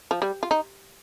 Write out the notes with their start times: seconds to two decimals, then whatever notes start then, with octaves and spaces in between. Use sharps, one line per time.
0.11 F3
0.22 G3
0.43 F4
0.51 D#4